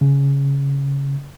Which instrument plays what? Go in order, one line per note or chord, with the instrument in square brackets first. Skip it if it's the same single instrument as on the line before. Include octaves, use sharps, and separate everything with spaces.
[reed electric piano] C#3